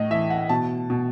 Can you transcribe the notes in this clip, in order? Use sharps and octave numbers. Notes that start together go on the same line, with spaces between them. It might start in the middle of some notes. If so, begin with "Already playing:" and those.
Already playing: A2 D#5
E3 E5
F#5
B2 A5
B2